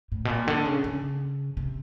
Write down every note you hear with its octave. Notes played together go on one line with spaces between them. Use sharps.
A2
B2
A#2
D3
C#3
C#3
C3